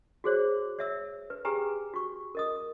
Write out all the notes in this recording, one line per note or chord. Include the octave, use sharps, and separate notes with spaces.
F#4 G#4 C5 C#5
C#5 E5 E6
B4
G4 G#4 B4 G5 G#5 A#5
F#4 C#6
A#4 D#5 D#6